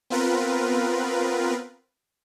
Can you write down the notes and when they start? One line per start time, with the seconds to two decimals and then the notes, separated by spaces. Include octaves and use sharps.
0.10 B3 C4 F4 A#4 B4